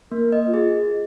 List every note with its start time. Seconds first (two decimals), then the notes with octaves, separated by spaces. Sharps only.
0.12 A#3 A#4
0.32 D#5
0.47 F4
0.54 G#4